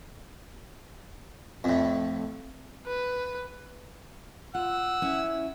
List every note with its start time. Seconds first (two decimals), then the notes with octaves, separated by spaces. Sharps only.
1.64 F2 A2
2.86 B4
4.55 F4 F#5 E6
5.02 C#4 E4